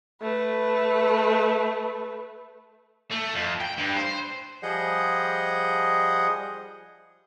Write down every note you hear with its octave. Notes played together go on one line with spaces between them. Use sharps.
A3 B4
A3
F2
G5
G2
C5
F3 G3 G#4 D#5 F#5 G6